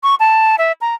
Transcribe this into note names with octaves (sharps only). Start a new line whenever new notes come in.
C#6
A5
E5
A#5